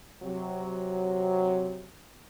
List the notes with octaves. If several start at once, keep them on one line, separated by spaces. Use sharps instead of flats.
C3 F#3